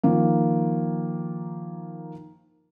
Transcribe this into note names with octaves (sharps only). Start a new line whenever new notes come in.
D#3 F3 A#3